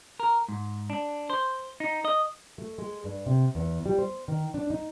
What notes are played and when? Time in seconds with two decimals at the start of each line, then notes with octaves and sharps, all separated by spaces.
0.20 A#4
0.48 G#2
0.90 D4
1.30 C5
1.80 D#4
2.05 D#5
2.58 A3
2.78 G#3
3.04 G2
3.26 C3
3.55 E2
3.86 G3
3.98 C5
4.28 D#3
4.54 D4
4.70 D#4